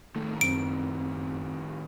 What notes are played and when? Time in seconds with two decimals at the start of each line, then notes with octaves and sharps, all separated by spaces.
0.16 A2 D#3 A3
0.41 F#2 C4 D7